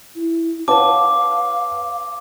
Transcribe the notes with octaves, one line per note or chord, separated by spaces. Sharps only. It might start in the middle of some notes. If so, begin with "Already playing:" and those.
E4
B4 C#5 F5 F#5 A5 B5 D6